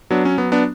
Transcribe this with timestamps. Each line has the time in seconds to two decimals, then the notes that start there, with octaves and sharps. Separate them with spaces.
0.10 F#3 B3 D4
0.25 C#4
0.38 F#3 B3
0.52 B3 D4